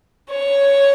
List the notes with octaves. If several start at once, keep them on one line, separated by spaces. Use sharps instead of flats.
C#5